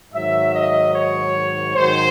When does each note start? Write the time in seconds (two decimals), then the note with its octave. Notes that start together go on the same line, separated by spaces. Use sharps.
0.13 G#2 D#3 F#3 E5
0.54 D#5
0.94 C#5
1.75 G#2 D#3 F#3 C5